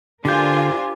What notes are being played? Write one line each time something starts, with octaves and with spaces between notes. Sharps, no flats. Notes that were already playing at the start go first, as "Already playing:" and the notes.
D3 D4 F4 G4 A#4 C5 G#5 G6